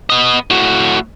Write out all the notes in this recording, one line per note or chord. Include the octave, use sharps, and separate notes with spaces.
B3 D#5
A2 F#4